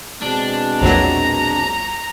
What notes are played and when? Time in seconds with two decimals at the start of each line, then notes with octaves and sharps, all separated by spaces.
0.22 B2 G#3 C4 D4
0.82 A#1 E2 F#3 A#5